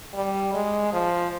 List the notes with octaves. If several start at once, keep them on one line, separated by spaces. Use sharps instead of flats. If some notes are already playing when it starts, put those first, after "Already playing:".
G3
G#3
F3